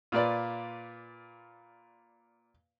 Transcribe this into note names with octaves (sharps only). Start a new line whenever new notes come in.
A#2 F4 B4 D5